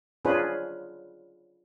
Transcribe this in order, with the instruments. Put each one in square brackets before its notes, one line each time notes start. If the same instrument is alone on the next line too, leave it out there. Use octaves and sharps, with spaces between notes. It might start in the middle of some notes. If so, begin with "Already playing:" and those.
[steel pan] C#4 D4 F4 G#4 B4 C5